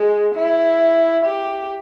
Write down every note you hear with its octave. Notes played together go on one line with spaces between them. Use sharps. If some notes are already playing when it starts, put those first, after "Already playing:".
Already playing: G#3
E4
G4